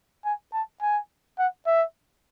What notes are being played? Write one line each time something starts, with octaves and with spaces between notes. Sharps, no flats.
G#5
A5
G#5
F#5
E5